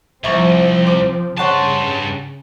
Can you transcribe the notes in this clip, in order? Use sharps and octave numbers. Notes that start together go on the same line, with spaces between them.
C2 F3 C4 E5 C#6 D6
D6
G2 C#3 C#5 F#5 A5 C6